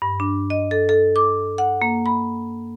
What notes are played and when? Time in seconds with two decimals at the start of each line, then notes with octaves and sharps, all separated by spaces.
0.02 G2
0.20 D4
0.50 D#5
0.71 A4
0.89 A4
1.16 D6
1.58 F#5
1.82 A#3
2.06 B5